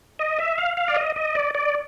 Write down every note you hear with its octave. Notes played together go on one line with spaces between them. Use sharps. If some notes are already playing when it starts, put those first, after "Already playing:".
D#5
E5
F5
F5
D5
D#5
D#5
D5
D5